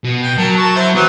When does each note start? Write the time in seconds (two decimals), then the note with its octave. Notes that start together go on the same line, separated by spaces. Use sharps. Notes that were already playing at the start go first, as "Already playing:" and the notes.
0.04 B2
0.23 G5
0.38 F#3 A#4 A5
0.57 A5 C#6
0.76 E4 C5
0.95 E3 F#3 B3 G4